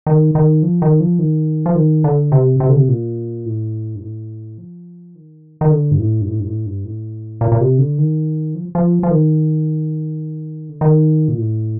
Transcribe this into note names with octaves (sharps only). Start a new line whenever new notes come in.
D#3
D#3
F3
D#3
F3
D#3
F3
D#3
D3
C3
C3
D3
C3
A#2
A2
G2
A2
F3
D#3
D#3
D3
G2
A2
G2
A2
G2
A2
G2
A2
A#2
A#2
C3
D3
D#3
F3
F3
F3
D#3
D3
D#3
A#2
A2